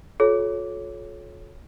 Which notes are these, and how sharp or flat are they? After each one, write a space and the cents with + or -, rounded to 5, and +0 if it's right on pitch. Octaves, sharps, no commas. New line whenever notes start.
F4 +40 A4 -35 C#5 +0